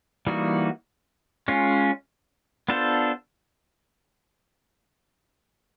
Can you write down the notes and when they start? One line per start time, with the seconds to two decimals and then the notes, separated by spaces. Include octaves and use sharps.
0.27 E3 G3 A#3 D#4 F#4
1.48 G#3 C#4 F4
2.69 B3 D4 F4 A4 C5